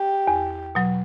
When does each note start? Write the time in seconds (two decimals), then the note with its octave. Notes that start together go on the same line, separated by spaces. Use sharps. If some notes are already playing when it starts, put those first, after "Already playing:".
Already playing: G4
0.27 E2
0.75 B2 F#3